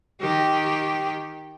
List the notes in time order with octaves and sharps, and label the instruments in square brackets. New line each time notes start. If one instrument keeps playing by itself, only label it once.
[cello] D#3 G4